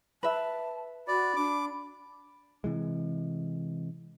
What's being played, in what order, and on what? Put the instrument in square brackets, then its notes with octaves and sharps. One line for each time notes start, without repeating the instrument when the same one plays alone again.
[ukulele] B4 E5 [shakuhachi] A5
[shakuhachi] F#4 [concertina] D5 [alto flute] B5
[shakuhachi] D4 [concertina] D6
[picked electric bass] C3 E3 G#3